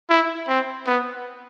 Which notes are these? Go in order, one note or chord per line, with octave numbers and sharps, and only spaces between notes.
E4
C4
B3